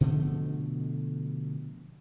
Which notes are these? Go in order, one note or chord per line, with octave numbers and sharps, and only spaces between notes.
B2 D3 F3 A3